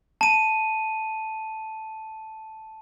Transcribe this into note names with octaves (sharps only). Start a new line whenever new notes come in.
A5 D#7